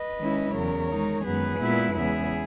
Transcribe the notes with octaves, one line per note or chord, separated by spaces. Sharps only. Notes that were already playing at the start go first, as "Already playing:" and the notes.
Already playing: B4 D#5
D#3 G#3 C#4 E4
E2 C#3 F#3 A#4 C#5
D#3 G#3 D#4
F#2 D#3 G#3 B3 G#4 B4
A#2 G#3 B3 E4
E2 C#3 G#3 B3 E4 G#4